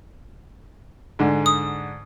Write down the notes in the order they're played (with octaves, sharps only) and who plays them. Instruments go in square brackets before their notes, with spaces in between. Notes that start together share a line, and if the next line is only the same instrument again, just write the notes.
[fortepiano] G#2 D3
[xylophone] D#6